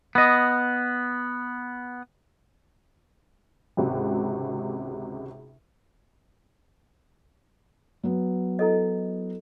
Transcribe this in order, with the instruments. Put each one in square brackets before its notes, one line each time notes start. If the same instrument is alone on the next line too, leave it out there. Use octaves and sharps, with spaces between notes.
[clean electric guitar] B3 D#5
[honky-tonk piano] G#1 C#2 C3 F#4
[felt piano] F#3 B3
[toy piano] E4 A4 D#5